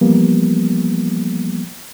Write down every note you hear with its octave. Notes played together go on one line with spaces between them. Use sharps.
E3 F3 G3 A#3 B3